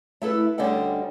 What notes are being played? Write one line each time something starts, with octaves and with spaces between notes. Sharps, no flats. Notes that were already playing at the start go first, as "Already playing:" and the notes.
A3 E4 A4 B4
D2 D3 G3 C#4 D#5 F#5